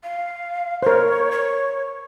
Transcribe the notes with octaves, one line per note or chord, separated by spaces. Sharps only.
F5
A#4 C5 C#5
C#5